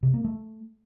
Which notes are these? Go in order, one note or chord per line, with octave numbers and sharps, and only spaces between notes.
C3
A#3
A3